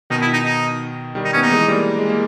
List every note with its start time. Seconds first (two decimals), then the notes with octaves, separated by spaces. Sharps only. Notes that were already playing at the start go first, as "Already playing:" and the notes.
0.10 B2 D#3 D#4
0.21 E4
0.33 D#4
0.45 D#4
1.15 D#3 G3
1.25 D#4
1.33 C#4
1.36 B3
1.42 A#3 D#4
1.51 E3 G#3
1.68 G3 A#3
1.99 G#3
2.09 A#3